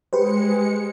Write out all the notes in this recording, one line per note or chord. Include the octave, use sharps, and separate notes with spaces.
G#3 G4 B4 C5 C#7